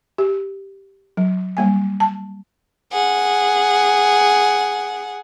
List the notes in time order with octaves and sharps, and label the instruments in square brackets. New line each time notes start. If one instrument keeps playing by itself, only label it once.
[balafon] G4
F#3
G3 A#3 G#5
A5
[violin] G#4 F#5